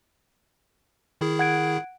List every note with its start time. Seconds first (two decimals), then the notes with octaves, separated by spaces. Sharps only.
1.21 D#3 E4 G#4
1.39 F#5 G#6 D7